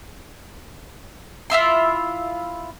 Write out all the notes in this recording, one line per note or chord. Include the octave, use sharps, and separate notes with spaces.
E4 F4 E5 C6